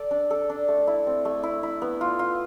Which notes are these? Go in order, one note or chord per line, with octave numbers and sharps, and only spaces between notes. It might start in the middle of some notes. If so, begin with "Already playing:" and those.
Already playing: A4 D5
D4
A4
D4
A3
E4
C4
A3
E4
E4
B3
F4
F4